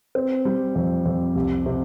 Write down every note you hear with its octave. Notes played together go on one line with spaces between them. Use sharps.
C4
G3
F2
F2
C2
C3